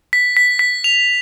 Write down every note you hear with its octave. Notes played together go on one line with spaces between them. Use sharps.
B6
B6
B6
F7